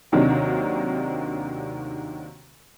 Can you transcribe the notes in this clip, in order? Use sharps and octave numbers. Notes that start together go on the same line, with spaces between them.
D#2 C3 D#3 F#3 D4